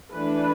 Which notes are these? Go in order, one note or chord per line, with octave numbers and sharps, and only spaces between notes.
E3 A3 D4 B4